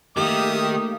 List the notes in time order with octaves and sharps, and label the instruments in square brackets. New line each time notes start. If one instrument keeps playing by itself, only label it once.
[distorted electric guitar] D#3 [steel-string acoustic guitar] A3 A#3 F5 [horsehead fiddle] G4 [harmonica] E5 D#6